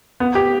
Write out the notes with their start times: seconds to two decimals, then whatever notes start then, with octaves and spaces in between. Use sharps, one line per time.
0.20 B3
0.35 G4